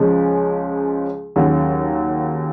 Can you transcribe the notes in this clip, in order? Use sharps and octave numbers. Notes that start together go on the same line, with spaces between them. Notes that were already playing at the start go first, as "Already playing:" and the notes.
Already playing: C#2 C#3 F3 G#3 C#4
D#2 C#3 F#3